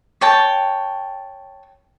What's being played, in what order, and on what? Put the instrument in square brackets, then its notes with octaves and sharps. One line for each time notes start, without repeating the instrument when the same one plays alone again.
[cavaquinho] C#5 G5 A5